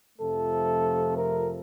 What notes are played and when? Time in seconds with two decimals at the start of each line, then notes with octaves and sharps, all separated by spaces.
0.18 F2 C3 F3 A3 A4
1.14 A#4